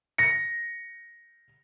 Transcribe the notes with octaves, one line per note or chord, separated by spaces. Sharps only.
A#6 C#7